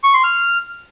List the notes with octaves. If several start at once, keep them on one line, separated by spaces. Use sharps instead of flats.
C#6
C6
F6